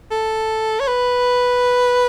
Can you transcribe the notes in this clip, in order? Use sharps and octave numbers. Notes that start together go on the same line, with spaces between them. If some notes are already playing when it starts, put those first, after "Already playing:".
A4
C#5
B4